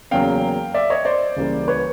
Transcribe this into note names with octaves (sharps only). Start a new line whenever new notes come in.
E2 C#3 F#3 A#3 F5 G5
D5 E5
C#5 D#5
C5 D5
C#2 C#3 E3 G3 A#3
B4 C#5